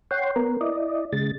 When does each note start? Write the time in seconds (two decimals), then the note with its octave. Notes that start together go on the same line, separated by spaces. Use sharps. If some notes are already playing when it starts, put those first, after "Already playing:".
0.11 C#5 F#5 G5 C6
0.36 B3 A#4
0.61 E4 D5 D#5
1.13 C#3 G#3 A6